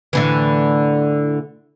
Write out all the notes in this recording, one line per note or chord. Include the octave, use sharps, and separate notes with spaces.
A2 D3 E3